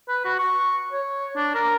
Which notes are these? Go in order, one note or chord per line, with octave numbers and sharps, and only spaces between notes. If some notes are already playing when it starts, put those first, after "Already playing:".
B4
F#4
C#6
C#5
D4
A#4